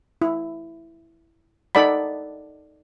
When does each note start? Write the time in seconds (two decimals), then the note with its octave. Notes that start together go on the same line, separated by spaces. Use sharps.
0.21 E4
1.75 D#4 A4 D5 F#5 B5